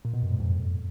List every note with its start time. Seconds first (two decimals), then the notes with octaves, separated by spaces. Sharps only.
0.05 A#2
0.14 B2
0.22 F#2
0.31 G#2
0.40 F2